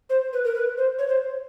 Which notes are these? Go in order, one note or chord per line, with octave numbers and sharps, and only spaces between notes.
C5
B4
A#4
B4
C5
C#5
C5